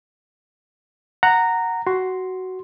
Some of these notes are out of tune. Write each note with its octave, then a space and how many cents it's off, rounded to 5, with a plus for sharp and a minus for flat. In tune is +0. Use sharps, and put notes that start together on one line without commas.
F#5 +0 A#5 -10
F#4 +10 C6 +0